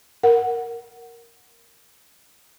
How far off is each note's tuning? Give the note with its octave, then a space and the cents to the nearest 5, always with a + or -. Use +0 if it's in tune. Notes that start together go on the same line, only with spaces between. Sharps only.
A#4 +0 F#5 +0